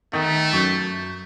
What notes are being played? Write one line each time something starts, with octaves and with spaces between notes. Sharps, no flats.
D#3 A3
F#2 C#6 G6